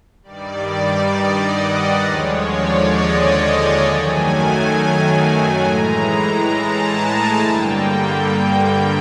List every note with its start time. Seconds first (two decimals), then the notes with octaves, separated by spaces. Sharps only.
0.23 G2 D#3 G3 D5
1.12 D#5
1.43 F#5
1.72 F#5
2.02 D#2 D3 F3 G#3 C#5
2.47 D5
2.92 D#5
3.81 F#2 D#3 F#3 A3 G#5
5.60 A2 E3 G#3 A#5
6.19 A#5
6.49 A5
6.94 G#5
7.39 G2 D3 G3 A#3 G5
8.29 G5